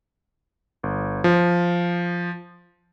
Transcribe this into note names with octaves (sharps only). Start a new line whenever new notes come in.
G1
F3